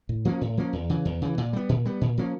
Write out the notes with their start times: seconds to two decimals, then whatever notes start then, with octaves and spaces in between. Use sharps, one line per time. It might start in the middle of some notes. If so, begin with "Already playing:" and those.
0.09 A2
0.25 F3 A#3 C#4
0.41 A2
0.57 F3 A#3 C#4
0.73 E2
0.90 C#3 E3
1.05 E2
1.22 C#3 E3
1.38 A#2
1.53 G3 B3
1.69 A#2
1.85 G3 B3
2.01 A#2
2.17 F3 A#3 C#4